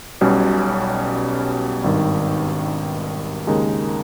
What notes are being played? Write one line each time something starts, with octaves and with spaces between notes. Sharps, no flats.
B1 B2 G3 C#4
G#1 G2 D#3
D#2 C#3 G#3 D#4 A#4